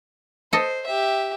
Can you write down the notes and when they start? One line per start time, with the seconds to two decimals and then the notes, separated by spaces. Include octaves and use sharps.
0.53 A4 C5 D#5
0.86 G4 E5